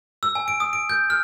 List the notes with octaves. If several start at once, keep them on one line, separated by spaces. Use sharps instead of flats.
E6
G#5
D7
D#6
D7
G6
F6